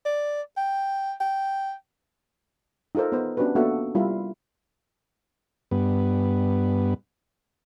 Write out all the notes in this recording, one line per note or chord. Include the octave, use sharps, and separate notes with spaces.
D5
G5
G5
D#4 F4 A4 A#4 C5
B3 D#4 B4 C5
B3 C#4 D4 F#4 G4 B4
A#3 B3 D4 F#4 A4 E5
G3 E4 F4 A#4
G2 B3